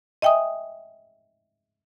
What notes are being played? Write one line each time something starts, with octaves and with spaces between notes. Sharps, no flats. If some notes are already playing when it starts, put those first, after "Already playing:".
D#5 E5 G5 G#5 D#6